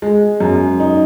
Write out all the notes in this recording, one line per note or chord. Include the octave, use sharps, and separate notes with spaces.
G#3
F#2
D#4